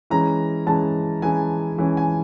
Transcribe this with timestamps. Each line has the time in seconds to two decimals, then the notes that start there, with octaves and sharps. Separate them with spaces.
0.10 E3 G#3 C#4 A#5
0.66 E3 G#3 C#4 A5
1.22 E3 G#3 C#4 G#5
1.78 E3 G#3 C#4
1.97 G#5